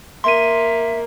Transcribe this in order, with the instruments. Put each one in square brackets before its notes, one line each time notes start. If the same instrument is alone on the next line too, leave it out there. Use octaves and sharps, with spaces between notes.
[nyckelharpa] A#3 [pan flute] E5 [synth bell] C6 D#7